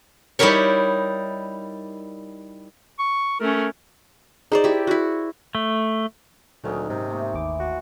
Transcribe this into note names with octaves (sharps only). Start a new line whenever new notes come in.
G3 D#4 E4 G4 A#4 C#5
C#6
A3 C#4 A#4
D#4 G#4 C5 D5 A#5 E6
E4 G4
E4 F#4
A3
D2 A#2 D#3 F#3 C#4 G#4
G#2 C3 A#3 D#4
A3 D#4 C5
G1 D#2 E3 D6
F#4